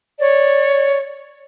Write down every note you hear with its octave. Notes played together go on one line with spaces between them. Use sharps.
C#5 D5